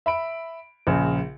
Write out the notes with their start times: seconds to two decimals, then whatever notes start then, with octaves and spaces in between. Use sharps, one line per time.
0.06 E5 B5 D7
0.87 A#1 C#3